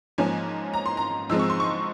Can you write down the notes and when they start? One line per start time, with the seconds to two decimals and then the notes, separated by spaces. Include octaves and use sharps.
0.18 G#2 F3 A#3 C#4 G#5
0.73 A#5
0.86 C6
0.97 A#5
1.29 G#2 F3 G#3 C4 E6
1.39 C#6
1.50 C6
1.60 C#6